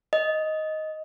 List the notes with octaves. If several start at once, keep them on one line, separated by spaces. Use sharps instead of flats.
D#5